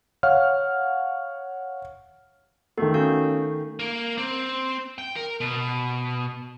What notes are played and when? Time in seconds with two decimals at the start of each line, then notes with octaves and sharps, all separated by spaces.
0.23 C#5 F5 F#5 F6
2.78 D#3 A3 B3
2.94 C#4 F#4 F5
3.79 A#3
4.18 C4
4.98 G5
5.16 A#4
5.41 B2